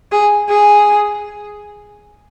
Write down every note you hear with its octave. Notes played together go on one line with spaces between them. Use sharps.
G#4
G#4